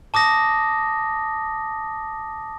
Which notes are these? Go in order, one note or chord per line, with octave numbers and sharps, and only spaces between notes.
A5 D6 D#6 A#6